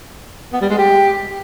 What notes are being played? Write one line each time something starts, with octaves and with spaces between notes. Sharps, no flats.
B3
G3
G#3
G4